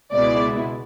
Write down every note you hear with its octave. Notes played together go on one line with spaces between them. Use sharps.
C#2 B2 G#3 B3 E4 D5